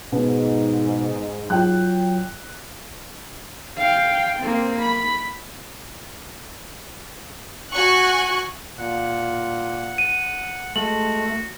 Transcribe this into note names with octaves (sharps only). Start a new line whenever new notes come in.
G#2 B2 B3
F#3 F4 G5 F#6
F5 G5
A#3 C4
B5
F#4 G#5 C#6 F#6
A#2 F#5
D#7
G#3 A3 F#4 F#7